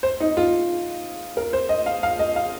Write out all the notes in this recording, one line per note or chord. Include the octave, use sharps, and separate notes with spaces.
C5
D#4
F4
A#4
C5
D#5
F5
F5
D#5
F5